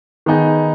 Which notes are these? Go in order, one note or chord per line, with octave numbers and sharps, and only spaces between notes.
D#3 B3 D#4 G#4